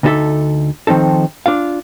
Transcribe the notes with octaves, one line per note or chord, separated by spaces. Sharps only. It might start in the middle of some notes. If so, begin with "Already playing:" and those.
D2 D3 D#4 F#4 A4 E5
D#3 F3 C4 D#4 A4
D4 F4 F5